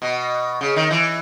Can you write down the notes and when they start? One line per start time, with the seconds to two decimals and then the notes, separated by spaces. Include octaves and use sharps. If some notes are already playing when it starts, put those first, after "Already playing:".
0.02 B2
0.61 C#3
0.76 D#3
0.91 E3